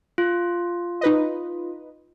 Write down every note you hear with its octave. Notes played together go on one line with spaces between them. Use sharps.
F4
D#4 B4 D#5